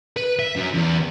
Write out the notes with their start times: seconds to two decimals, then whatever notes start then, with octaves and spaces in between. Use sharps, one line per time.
0.17 B4
0.39 E5
0.56 F#2
0.74 E2